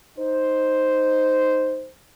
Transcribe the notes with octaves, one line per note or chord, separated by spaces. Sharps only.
D#4 C5